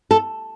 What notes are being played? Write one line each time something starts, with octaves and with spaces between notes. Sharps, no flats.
A4